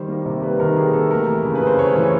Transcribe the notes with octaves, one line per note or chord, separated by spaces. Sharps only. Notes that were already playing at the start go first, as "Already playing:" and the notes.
Already playing: D#3 G3 C5
A#3
C3
G3 B4
D#3 A#4
A#3 G#4
C3 A4
A3 A#4
E3
C#3
B4
C#3 C5
A3 C#5
E3 C#5